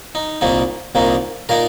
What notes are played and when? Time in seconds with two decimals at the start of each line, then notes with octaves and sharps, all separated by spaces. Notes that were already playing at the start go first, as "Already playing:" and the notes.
0.15 D#4
0.41 C2 A#2 A#3 D#4
0.95 C2 A#2 A#3 D#4
1.49 A#2 A#3 D#4 A#4